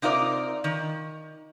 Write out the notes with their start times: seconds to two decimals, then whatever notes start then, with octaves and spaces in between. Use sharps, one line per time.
0.02 C3 D#4 F4 A#4 D5
0.64 D#3